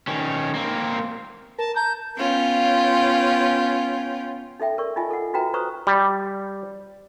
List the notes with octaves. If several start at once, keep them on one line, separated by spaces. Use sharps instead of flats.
D#3 C#4
A#3 C4
A#4 A5
A5 A#5 G6
B3 C#4 F4 G5
D#4 A4 E5 G5
A#4 D5 C#6
D#4 F4 D#5 G#5
A4 F#5
D#4 F#4 B4 E5 G5 A#5
B4 C5 A#5 C#6 D#6
G3